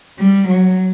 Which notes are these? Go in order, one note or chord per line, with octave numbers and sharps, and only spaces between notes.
G3
F#3